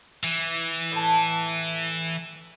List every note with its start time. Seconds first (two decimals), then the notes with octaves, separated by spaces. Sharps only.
0.24 E3
0.92 A2 A5